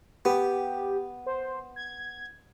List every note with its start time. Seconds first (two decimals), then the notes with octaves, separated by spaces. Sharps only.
0.25 B3 G4
1.26 C5
1.76 G#6